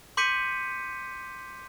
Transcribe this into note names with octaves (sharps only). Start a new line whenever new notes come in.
C6 D6 G6 B6 C#7 D#7